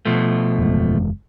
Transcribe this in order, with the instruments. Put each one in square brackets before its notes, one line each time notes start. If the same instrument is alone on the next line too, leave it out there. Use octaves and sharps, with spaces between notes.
[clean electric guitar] B2 F3 A3
[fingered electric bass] F#1 E2 G#3